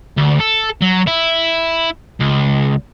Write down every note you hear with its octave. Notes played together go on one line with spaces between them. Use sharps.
D2
A4
F#3
E4
C#2